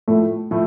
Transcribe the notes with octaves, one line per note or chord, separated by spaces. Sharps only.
A2 F3 A3
A2 F3 A3